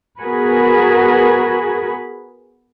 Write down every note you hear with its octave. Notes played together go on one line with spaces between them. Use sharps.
B3 F#4 G#4 A#4 B4